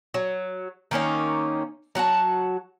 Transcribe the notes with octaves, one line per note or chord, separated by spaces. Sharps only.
F#3
D#3 A#3 C#4 D#4
F#3 F#4 F#5 A5